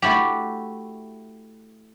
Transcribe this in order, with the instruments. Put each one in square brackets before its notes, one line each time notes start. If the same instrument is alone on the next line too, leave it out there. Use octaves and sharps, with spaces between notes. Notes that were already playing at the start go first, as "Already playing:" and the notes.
[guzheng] A3 E4 F#4 G4